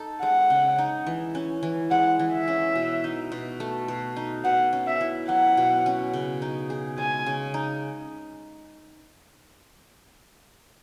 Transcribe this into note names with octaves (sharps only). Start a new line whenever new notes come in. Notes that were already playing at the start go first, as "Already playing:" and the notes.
Already playing: D#4 A4
G#3 F#5
C#3
D#4
E3
C#4
E3
G#3 F#5
E3
E5
C#4
B2
D#4
B2
A3
B2
D#4
B2 F#5
C#4
E5
E4
F#3 F#5
B2
C#4
C#3
D#4
G#4
G#3 G#5
C#3
D#4